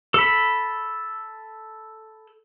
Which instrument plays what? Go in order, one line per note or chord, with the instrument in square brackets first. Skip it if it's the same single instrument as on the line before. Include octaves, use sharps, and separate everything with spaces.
[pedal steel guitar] A4 B5